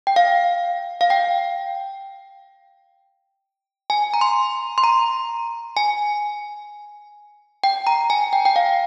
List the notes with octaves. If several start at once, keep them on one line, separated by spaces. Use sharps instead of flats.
G5
F5
F5
G5
G#5
A#5
C6
C6
A#5
G#5
G5
A#5
G#5
G5
G5
F5